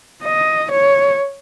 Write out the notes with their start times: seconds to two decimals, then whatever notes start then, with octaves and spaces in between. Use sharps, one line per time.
0.24 D#5
0.71 C#5